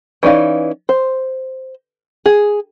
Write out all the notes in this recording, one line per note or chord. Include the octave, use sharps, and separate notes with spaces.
E3 C#4 D#4 D5 F5
C5
G#4